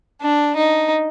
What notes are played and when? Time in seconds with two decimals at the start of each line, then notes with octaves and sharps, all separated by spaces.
0.22 D4
0.56 D#4